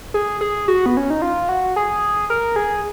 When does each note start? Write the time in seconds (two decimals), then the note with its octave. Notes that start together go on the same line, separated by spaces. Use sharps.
0.14 G#4
0.41 G#4
0.68 F#4
0.86 B3
0.97 C#4
1.10 D#4
1.22 F4
1.49 F#4
1.76 G#4
2.30 A#4
2.56 G#4